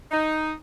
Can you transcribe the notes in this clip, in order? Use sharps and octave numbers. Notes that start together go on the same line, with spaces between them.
D#4